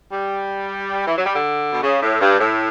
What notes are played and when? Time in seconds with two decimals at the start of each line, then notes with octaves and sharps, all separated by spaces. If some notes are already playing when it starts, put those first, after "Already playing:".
0.12 G3
1.07 E3
1.17 F#3
1.26 G3
1.36 D3
1.73 B2
1.83 C#3
2.02 A2
2.21 G2
2.40 A2